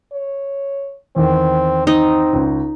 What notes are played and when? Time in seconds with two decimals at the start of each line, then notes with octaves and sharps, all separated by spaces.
0.13 C#5
1.16 E2 D#3 C4
1.87 C4 D#4
2.33 C#2